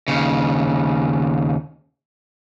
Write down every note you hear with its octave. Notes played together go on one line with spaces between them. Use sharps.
D#2 C#3